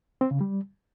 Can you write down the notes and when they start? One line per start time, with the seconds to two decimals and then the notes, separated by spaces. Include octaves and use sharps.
0.21 C4
0.31 C#3
0.41 G3